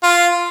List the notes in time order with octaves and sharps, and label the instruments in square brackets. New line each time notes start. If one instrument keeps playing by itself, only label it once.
[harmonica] F4